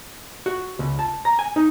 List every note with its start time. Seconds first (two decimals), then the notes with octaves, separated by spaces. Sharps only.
0.46 F#4
0.79 C#2
0.99 A5
1.25 A#5
1.39 G#5
1.56 D#4